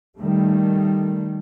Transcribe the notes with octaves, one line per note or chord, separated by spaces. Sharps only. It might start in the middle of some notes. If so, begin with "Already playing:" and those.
D#3 G3 A3